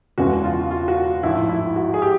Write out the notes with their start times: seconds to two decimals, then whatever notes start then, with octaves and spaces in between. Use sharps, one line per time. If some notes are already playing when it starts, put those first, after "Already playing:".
0.18 E1 E2 C#3 E3 G#3 F#4
0.44 F4
0.71 F4
0.88 F#4
1.23 A1 G#2 F3 E4
1.49 E4
1.76 F#4
1.94 G#4
2.02 G4